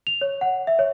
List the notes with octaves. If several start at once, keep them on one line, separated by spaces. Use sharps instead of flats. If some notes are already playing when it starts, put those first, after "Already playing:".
F7
C#5
F#5
E5
C#5